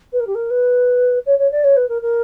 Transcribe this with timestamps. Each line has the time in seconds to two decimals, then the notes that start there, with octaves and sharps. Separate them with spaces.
0.12 B4
0.20 A#4
0.27 G4
0.35 A#4
0.50 B4
1.26 C#5
1.38 C#5
1.51 D5
1.64 C#5
1.76 B4
1.89 A#4
2.02 A#4